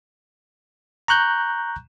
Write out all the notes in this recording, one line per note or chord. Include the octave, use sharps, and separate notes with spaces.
A#5 C#6 F#6 G6